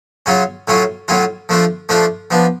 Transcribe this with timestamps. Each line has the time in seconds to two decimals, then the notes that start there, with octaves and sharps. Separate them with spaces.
0.26 C#3 F#3 C#4 F4
0.68 A2 F#3 C#4 F4
1.08 A2 F#3 C#4 F4
1.49 F3 A3 D4 F4
1.89 F3 A3 D4 F4
2.31 F3 B3 D4